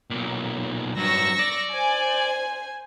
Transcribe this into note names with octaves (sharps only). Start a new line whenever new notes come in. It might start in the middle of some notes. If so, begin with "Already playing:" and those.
B1 A#2
G2 F#3 C#6 E6 A#6
D5
C5 G#5